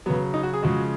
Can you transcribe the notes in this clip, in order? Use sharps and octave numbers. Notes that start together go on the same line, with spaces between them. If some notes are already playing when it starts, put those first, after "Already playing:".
C#3 F#3 B3
D#4
F#4
G#4
C#3 F3 G#3 F#4